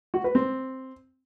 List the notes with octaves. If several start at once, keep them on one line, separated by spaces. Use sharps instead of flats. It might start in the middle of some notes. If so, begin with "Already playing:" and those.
F#4
B4
C4